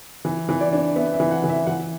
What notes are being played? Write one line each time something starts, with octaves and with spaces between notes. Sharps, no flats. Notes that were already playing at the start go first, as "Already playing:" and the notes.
E3
E3
D5
D4
B3 E5
E5
E3
F#5
E3
E5
E3 F#5